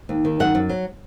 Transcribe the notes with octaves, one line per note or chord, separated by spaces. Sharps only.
D#2
D#3
F#2 F#5
F#2
F#3